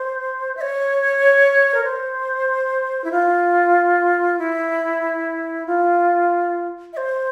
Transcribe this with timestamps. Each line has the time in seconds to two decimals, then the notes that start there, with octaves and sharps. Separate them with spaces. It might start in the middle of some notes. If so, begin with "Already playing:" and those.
Already playing: C5
0.57 E5
0.61 C#5
1.74 A#4
1.84 C5
3.04 E4
3.11 F4
4.39 E4
5.67 F4
6.93 E5
6.97 C5